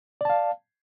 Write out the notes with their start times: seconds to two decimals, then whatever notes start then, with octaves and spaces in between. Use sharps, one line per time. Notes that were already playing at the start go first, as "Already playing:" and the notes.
0.21 D5
0.25 A5
0.30 F5